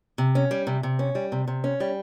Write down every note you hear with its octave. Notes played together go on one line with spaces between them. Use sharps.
C3
C#4
G3
C3
C3
C#4
G3
C3
C3
C#4
G3